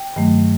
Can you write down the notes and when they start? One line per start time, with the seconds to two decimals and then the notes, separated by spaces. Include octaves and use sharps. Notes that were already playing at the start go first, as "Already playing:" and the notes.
Already playing: G5
0.16 G2 D#3 F#3 A3